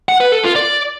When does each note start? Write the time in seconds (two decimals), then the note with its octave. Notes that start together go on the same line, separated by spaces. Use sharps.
0.09 F#5
0.20 B4
0.32 A4
0.44 F4
0.56 D5